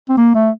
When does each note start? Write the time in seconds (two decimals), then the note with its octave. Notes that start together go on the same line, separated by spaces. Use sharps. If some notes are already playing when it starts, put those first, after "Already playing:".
0.09 C4
0.17 A#3
0.35 A3